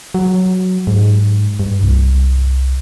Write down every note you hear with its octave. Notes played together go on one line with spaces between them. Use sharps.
F#3
G#2
G2
C2